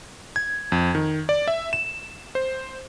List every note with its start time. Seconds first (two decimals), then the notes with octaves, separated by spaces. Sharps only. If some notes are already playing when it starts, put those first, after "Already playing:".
0.36 G#6
0.72 F2
0.95 D#3
1.29 D5
1.48 E5
1.73 E7
2.35 C5